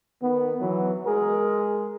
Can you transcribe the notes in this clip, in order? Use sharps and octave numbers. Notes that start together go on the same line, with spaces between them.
D#3 B3
E3 F#3 B3
G#3 G#4 A#4